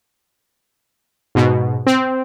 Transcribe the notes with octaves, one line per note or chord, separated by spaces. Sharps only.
G#2 B2
C4